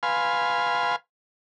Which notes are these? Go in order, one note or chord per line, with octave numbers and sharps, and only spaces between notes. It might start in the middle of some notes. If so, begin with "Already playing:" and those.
B4 F5 G#5 C6